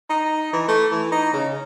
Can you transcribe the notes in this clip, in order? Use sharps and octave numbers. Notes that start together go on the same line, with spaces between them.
D#4
E3
A3
E3
D#4
C#3